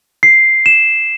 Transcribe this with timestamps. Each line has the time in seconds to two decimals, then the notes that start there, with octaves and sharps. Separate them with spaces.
0.23 C7
0.66 E7